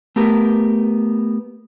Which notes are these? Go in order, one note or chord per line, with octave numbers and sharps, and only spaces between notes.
A3 B3 G4 A#4